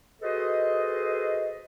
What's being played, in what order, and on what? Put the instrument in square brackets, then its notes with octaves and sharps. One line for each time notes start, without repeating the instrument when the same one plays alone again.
[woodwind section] F#4 G#4 A4 B4 C5 D#5